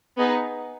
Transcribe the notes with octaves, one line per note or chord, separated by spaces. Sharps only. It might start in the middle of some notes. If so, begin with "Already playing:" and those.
B3 D#4 G#4